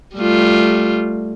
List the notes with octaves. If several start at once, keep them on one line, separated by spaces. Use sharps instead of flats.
G3 A3 F4